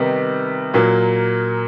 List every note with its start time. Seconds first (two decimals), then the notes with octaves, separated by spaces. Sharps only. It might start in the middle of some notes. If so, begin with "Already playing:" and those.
Already playing: C3 D#3 G3 B3 D#4
0.74 A#2 F#3 A#3